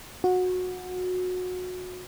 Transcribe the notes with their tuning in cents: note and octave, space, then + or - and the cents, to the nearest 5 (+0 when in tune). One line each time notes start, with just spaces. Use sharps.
F#4 -25